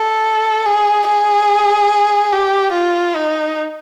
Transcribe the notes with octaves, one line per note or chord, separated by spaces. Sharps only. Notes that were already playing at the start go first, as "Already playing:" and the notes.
Already playing: A4
G#4
G#4
G4
F4
D#4